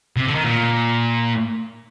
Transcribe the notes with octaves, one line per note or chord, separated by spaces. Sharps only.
C3
D3
D#3
A#2